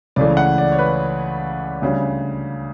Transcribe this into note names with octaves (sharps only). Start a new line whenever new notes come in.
C#2 C#3 E3 A3 D5
F#5
D5
C#5
B4
D2 C#3 G3